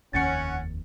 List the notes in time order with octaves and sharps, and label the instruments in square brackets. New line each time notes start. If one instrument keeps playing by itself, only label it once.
[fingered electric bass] F1 D#2 D#3 [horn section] C#4 F#5 [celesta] A6 C#7